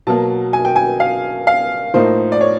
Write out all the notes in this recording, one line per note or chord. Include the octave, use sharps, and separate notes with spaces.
B2 F#3 A#3 A5
G#5
G5
G#5
F5
F5
A2 F3 A#3 D#4 C5
D5
C#5